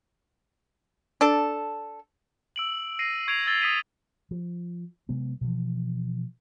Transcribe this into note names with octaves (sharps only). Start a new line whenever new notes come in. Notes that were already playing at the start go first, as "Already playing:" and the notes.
D4 A4
E6 D7 F#7
A#6 C7 D7 D#7
C#6 G#6 C7 D7 F7
E6 G#6 A6 G7
D#6 B6 D#7
F3
C3 F#3 G#3 B3
B2 E3 F3